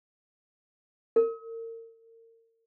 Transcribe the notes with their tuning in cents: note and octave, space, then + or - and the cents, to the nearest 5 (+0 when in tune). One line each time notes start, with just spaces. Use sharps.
A#4 -40